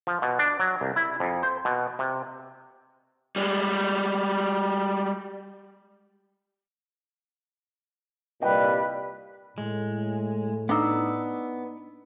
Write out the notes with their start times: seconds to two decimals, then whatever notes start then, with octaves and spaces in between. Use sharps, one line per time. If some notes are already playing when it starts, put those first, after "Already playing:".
0.07 F3
0.22 B2
0.39 D4
0.60 F#3
0.81 C2
0.96 E4
1.20 F2
1.43 C5
1.65 B2
1.99 C3
3.36 G3 G#3
8.42 C2 A#2 G3 B4 D#5 G5
9.58 A2 G#3
10.69 B3 D4 D#4 E6